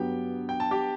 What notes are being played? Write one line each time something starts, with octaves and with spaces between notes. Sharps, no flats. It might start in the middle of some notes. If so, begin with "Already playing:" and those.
Already playing: G2 F#3 B3 G4 G5
G5
A5
G4 G5